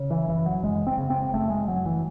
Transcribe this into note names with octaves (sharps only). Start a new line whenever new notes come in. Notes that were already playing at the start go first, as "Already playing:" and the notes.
Already playing: C#3
E3
F#1 E3
F#3
F#1 G#3
C4
C#3
C4
F#1 A3
G#3
F#1 F#3
E3